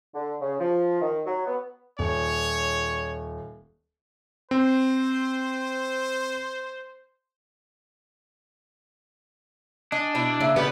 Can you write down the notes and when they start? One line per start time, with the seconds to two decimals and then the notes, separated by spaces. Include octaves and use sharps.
0.14 D3
0.41 C#3
0.59 F3
1.01 D#3
1.26 F#3
1.46 B3
1.99 D#1 C#5
4.51 C4 C5
9.92 D4 D#5 G#5
10.15 B2 D#4 E4
10.41 C#3 A#3 E5
10.56 D2 B2 G3 B3 G4 B4 D5